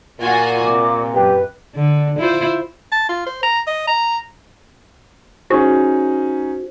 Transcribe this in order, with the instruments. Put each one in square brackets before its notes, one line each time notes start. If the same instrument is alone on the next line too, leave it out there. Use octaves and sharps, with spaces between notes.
[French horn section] A#2 [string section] F4 F#4 G#5
[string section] C3 [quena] D6
[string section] F#2 [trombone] G4 [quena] B4
[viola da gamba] D3
E4 F4 C5
[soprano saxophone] A5
F4
C5
A#5
D#5
A#5
[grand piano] C#4 D#4 G#4 [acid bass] F#4 [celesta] C5